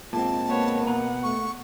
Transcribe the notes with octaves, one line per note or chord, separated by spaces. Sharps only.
A#2 G#3 C4 F4 A5
A#3 B3 C#5
B2 B4 F#5 A#5
A3 C#6